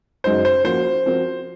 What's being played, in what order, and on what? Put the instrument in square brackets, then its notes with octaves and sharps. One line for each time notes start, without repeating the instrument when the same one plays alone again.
[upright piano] F#2 C#3 G#3 D#4 F#4 [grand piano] C5
[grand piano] C5
[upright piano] F3 A#3 C#4 F#4 [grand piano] C5
[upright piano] F3 C4 F#4 A#4